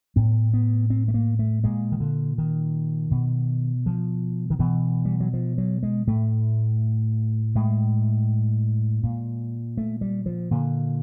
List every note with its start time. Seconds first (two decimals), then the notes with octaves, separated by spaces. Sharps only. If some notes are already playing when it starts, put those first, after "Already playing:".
0.16 A2 B3
0.54 B3
0.90 C4
1.08 A3
1.14 A#3
1.39 A3
1.64 A#2 G#3
1.92 D#3
2.00 D3
2.38 D#3
3.11 B2
3.86 F3
4.50 D#3
4.59 B2 E3
5.05 G3
5.20 F#3
5.34 F3
5.58 F#3
5.83 G#3
6.07 A2 A3
7.55 A2 G#3
9.03 A#2
9.77 A3
10.01 G3
10.26 F3
10.51 A#2 D3